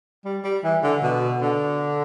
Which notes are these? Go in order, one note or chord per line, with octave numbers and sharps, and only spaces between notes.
G3
G3
E3
D3
B2
D3